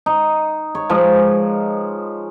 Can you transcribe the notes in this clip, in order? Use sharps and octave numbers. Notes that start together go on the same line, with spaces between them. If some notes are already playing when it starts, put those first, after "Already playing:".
D#4
C#5
F3 G#3 B4